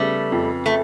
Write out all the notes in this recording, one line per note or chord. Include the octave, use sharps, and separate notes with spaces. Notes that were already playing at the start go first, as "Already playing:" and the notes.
Already playing: C#3 G3 A3 B3
F2
A3